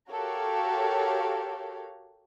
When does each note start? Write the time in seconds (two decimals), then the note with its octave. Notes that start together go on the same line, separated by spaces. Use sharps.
0.11 F#4 G4 A4 A#4 C#5 F5